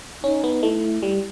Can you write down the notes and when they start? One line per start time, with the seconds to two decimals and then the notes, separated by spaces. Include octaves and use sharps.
0.24 C#4 D#4
0.44 B3
0.63 A3 E4
1.03 G3